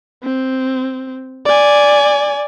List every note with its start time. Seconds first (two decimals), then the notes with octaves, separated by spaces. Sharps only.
0.23 C4
1.46 D5 G#5